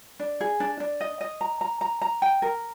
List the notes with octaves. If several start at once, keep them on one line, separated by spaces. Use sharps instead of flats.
D4
G#4
D4
D4
D#5
D#5
A#5
A#5
A#5
A#5
G5
A#4